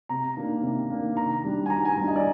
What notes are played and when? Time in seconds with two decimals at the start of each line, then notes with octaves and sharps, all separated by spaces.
0.09 C3 A#5
0.37 D#3 A#3 D4
0.63 C3
0.90 D#3 A#3 D4
1.17 D#3 A#5
1.44 G3 D4
1.66 G#5
1.70 D#3 A#5
1.85 G#5
1.97 G3 D4 A#5
2.07 D#5
2.16 D5